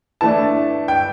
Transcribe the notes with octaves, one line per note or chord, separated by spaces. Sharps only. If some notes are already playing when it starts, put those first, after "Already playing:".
E3 A3 D4 A5
G5